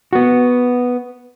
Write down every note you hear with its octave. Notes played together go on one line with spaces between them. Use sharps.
B3 F#4